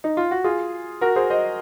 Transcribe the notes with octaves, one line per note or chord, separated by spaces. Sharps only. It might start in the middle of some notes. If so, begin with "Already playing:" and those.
D#4
F4
F#4
F4 G#4
F#4 A#4
G#4 C5
C5 D#5